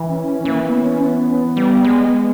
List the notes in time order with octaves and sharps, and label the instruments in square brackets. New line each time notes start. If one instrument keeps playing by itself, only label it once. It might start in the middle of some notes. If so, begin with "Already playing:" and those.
Already playing: [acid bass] E3
[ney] C#4
C#4
[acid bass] E3 [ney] A#3
[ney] B3
C#4
B3
[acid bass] G3
G#3